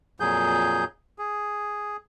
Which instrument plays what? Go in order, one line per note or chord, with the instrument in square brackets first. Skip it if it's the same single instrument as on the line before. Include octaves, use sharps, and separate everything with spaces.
[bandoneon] F2 A#2 F#3 G#4 G6
G#4